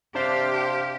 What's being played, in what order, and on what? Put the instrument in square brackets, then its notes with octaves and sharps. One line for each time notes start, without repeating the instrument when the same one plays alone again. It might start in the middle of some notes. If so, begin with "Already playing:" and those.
[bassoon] C3 [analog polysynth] D4 C5 F5 [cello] G4